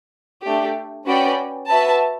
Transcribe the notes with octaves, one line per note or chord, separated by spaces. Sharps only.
A3 D4 G4
C#4 F#4 B4 D5 G5
F#4 B4 E5 A5